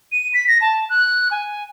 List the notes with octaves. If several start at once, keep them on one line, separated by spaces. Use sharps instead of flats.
D#7
B6
A#6
A5
F#6
G#5